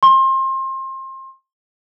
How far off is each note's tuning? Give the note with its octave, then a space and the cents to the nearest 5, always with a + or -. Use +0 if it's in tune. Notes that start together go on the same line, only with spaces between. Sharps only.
C6 +30